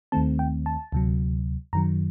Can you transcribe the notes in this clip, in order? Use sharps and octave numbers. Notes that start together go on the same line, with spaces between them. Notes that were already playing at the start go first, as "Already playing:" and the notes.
D#2 D#3 A3 C4 A5
G5
A5
D2 C3 F#3
F#2 D#3 F#3 A#5